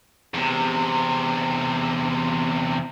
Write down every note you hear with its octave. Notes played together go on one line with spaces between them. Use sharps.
E2 C3